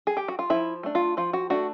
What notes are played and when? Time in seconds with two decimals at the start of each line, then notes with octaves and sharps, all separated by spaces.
0.07 G#4
0.17 G4
0.28 F#4
0.39 F4
0.50 F3 E4
0.83 A3 D4
0.95 F4
1.17 F3 F4
1.33 F#4
1.50 A3 D4 F#4